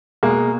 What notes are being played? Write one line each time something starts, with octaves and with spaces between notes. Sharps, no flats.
B2 G#3 A#3